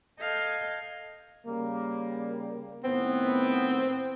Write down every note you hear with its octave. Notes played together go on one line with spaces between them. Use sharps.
A4 D#5 F5 G6 G#6
C#3 G3 A#3
A2 D#3 B3 C4